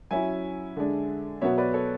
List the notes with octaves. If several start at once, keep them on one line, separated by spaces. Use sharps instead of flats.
F#3 C#4 E4 E5 G#5
D3 G#3 D4
B2 F#3 B3 C#5 E5
B4 D5
A4 C#5